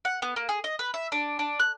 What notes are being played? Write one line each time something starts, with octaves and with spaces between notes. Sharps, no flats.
F#5
B3
A#3
G#4
D#5
B4
E5
D4
D4
F#6